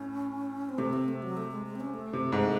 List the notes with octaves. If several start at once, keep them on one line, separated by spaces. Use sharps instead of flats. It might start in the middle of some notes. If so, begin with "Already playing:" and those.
Already playing: A2 C#4
C4
C3 A3
C4
A3
F#3
A3
G#3
G#3
C4
C#4
A3
C3
G#2 G#3